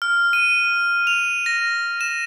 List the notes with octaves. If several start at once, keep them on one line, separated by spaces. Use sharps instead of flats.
F6
D#7
F7
A#6
E7